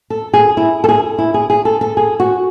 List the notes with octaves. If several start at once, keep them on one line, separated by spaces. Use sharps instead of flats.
A4
G#4
E4
A4
G#4
E4
G#4
G#4
A4
A4
G#4
F#4